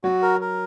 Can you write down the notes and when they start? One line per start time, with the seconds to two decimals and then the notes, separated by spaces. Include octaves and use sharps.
0.04 F#3 F#4
0.22 A#4
0.41 A#4